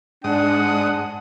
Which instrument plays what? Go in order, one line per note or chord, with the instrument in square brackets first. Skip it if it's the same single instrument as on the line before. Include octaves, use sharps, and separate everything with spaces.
[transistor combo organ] G#2 D#6 [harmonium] D4 [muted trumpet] F#5